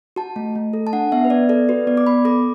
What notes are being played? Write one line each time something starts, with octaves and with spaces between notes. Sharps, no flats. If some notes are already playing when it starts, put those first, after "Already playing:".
F#4 A5
A3
A3
A4
A5
D4 F#5
B3 E5
B4
B3 D5
A4 D5
F#4 B4
B3 D5
D6
B3 B5
A4 D6